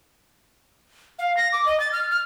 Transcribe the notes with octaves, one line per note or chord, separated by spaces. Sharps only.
F5
A#6
D6
D#5
A6
F6
F6